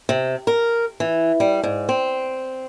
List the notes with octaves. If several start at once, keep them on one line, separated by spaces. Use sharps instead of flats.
C3
A#4
E3
G3
G#2
C4